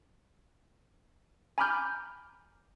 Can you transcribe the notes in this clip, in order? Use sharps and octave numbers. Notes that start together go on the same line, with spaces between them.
G#5 A#5 B5 D6 F6 G6